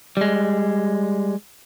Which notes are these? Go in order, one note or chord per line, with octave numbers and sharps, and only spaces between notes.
G3 G#3